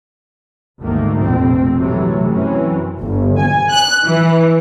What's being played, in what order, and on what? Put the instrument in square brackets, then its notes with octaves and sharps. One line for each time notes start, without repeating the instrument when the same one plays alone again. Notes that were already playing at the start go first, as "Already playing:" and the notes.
[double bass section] G#1 D2 G#2 D#3 A3 A#3
F1 A#1 F2 B2 C4
C3 E3 F#3 A3
F#2 E3 F#3 C4 C#4
[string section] G1
G#5
F#6
E3